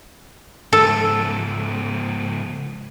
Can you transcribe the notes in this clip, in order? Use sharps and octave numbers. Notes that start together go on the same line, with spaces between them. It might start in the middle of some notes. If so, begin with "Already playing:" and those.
C#2 G#2 A4